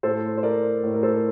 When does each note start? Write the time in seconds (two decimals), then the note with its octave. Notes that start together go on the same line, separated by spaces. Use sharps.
0.03 A2 A4 C5
0.38 C5
0.43 A#4 D5
0.83 A2
0.94 A#4
1.03 A4 C5